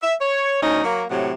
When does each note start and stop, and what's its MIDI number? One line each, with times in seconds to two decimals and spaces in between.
0.02 0.13 76
0.20 0.61 73
0.62 0.82 38
0.62 0.82 61
0.62 0.82 63
0.84 1.04 54
0.84 1.04 58
1.10 1.32 45
1.10 1.32 48
1.10 1.32 54